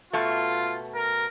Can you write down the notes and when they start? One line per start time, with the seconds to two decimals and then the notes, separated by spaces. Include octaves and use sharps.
0.13 B2 A3 F4
0.95 A#4